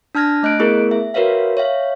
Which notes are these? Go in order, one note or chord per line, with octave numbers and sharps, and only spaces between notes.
D4 A5 F6 G#6 A#6
A3 D#5 F#6 D7
A3 B3 E4 G#4 A#4
E5
F#4 A#4 B4 C#5 E5 F5
C#5 E5 F5